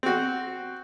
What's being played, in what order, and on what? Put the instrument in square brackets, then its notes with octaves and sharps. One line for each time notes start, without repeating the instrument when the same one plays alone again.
[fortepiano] C4 F#4